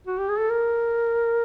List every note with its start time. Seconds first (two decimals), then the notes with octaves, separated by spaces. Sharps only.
0.07 F#4
0.18 G4
0.29 G#4
0.39 A4
0.50 A#4